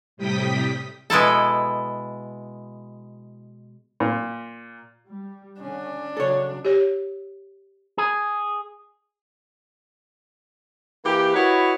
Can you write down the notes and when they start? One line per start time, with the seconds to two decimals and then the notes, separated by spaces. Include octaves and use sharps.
0.17 A2 C3 G3 G5 D#6 B6
1.10 B2 G#3 E4 A4
4.00 A#2
5.06 G3
5.61 D3 C#4 D4
6.17 C#3 F#3 A4 C#5
6.65 G4 C#5
7.98 G#4
11.05 E3 A#3 G4
11.34 E4 F#4 B4 C#5 D#5